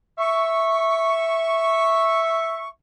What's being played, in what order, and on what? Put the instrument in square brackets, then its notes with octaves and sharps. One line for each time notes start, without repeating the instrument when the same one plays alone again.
[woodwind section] E5 C#6